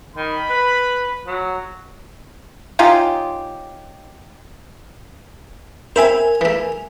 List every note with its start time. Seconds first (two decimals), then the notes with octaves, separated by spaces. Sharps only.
0.16 D#3 B5
0.50 B4
1.27 F#3
2.79 C#4 D#4 F4 G4
5.96 C4 E4 A#4 C5 G#5
6.41 E3 A3